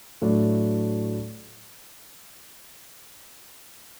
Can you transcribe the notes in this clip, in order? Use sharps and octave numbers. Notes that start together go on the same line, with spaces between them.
A2 F#3 A3 D4